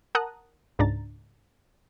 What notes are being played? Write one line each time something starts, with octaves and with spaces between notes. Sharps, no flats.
A#4 F#5 A5 A#5 D#6 F#6
C#2 G#2 D4 A#5 A6